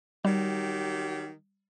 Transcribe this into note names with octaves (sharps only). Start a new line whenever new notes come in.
D#3 F#3 G3 G4